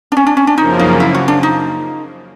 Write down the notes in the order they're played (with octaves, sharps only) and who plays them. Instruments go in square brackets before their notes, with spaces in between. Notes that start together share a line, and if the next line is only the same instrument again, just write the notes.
[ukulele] D4
C#4
D4
C#4
D4
[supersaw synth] F#2 C#3 F3 A#3 [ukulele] D#4
[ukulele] D#4
E4
F#4
D4
D#4